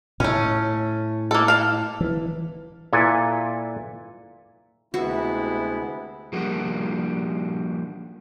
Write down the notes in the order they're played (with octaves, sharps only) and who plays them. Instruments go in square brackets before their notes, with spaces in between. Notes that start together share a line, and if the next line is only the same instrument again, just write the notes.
[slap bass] A2 [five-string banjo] A3 C#4
[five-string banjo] A#3 A4
F5 A5
[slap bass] E3
[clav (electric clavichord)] A#2 E4 A4 B4 G#5
[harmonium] D2 B3 [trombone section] C3 G#3 E4 [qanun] F#4
[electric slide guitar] F3 G3 A#3 D4 F#4 G4